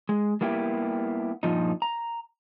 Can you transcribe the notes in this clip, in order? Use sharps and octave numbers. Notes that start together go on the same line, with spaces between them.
G#3
G3 A#3 B3 E4 G4
G2 A#2 F3 D#4
A#5